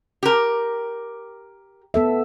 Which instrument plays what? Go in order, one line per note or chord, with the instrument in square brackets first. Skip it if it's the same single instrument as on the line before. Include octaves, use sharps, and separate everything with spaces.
[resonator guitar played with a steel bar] G4 A#4
[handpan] B3 A4 E5